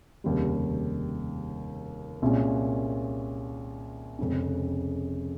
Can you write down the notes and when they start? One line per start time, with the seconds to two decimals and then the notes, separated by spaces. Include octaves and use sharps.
0.24 F1 D#2 C#3 G3
2.22 C2 A#2 G#3 C#4
4.19 F1 F2 C#3 G#3 C#4